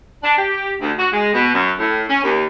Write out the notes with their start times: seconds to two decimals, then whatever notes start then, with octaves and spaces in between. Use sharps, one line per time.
0.23 D4
0.38 G4
0.80 D2
0.98 F#4
1.13 G#3
1.34 B2
1.53 F#2
1.79 A2
2.09 C#4
2.24 D#2